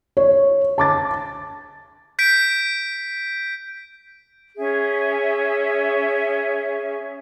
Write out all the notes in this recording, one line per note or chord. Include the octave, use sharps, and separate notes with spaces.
C#5
A5 D6 A6
G6 B6 D7
C#4 G#4 E5